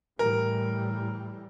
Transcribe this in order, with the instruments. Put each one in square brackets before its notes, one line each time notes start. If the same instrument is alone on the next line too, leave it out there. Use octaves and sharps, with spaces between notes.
[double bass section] A2 E3 G3 [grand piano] A#4